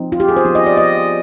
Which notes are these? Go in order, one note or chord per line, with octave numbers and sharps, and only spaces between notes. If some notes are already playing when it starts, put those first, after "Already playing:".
Already playing: F3 C4 D#4
F4
G4
G#4
C5
F3 B3 D#4
D#5
D5
D#5